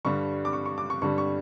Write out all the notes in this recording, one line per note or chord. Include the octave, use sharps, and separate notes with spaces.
G2 D3 G3 C#6
D6
C#6
C#6
D6
C#6
G2 D3 G3 C#6
C#6